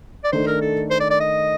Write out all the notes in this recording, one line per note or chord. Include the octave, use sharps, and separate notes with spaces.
D5
D#3 A3 D4 C5
A#4
A4
C5
D5
D5
D#5